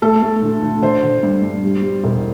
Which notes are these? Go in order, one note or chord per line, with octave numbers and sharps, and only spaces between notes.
A3 A4
A3
D2
D2
D3 C5
D3
G2
G2
G3
G3
E1